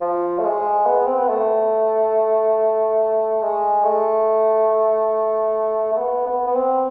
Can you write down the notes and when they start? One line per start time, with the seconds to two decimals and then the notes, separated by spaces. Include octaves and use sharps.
0.01 F3
0.39 A3
0.44 G#3
0.86 B3
1.06 C4
1.18 B3
1.29 A3
3.42 G#3
3.84 A3
5.92 A3
5.98 B3
6.27 B3
6.47 B3
6.55 C4